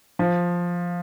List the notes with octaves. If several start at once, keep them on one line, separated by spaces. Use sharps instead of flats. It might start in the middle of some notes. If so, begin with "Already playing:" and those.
F3